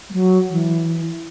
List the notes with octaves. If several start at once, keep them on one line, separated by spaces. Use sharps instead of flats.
G#3
F#3
E3